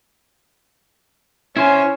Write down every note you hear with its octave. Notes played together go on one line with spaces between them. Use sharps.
C#4 E4 C5